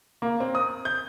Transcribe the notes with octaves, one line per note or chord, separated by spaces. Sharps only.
A#3
C4
D#6
G6